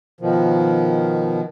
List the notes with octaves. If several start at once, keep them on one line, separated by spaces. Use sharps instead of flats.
B2 D#3 F3